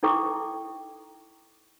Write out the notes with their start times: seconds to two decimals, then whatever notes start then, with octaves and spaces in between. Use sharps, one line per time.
0.03 D#4 E4 A4 G5 C#6 D6